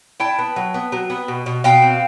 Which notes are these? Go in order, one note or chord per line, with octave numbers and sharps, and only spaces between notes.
E4 G5 A5
B3
F#3
B3
F#3
B3
B2
B2
B2 F5 G5
C4